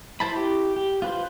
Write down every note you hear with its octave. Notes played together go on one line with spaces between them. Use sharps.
E4 C5 A5 B5
G4
G4
F4 B4 C5